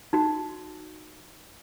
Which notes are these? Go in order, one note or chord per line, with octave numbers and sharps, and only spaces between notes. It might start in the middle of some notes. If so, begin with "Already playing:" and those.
D#4 F#4